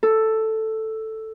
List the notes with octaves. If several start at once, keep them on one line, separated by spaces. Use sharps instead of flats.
A4